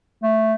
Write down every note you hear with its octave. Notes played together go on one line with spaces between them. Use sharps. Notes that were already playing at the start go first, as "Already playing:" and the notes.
A3